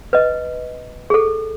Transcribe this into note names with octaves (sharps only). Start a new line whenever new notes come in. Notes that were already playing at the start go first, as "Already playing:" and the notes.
B4 D#5
G#4 A4